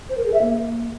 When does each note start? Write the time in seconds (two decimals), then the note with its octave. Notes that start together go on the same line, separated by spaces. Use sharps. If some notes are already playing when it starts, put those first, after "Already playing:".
0.09 C5
0.17 A#4
0.26 G#4
0.34 E5
0.42 A#3